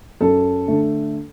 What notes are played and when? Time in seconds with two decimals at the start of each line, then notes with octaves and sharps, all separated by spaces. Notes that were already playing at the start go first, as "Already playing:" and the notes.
0.21 F#2 A4
0.68 D3 A3